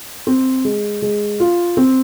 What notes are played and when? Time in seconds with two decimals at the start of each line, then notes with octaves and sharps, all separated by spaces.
0.27 C4
0.65 G#3
1.02 G#3
1.40 F4
1.77 C4